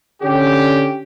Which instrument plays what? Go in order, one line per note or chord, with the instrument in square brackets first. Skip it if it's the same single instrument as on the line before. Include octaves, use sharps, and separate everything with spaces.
[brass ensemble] D3 C#4 G4